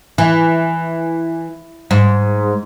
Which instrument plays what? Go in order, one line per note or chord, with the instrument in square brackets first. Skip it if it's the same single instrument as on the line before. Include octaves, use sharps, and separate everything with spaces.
[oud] E3
G#2